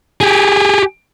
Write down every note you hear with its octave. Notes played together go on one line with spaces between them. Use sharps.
G4 G#4